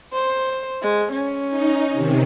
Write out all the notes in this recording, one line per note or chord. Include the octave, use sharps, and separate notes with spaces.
C5
G#3
C#4
D#4
C3 D#3